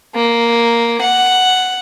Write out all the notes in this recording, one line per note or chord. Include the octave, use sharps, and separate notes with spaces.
A#3
F#5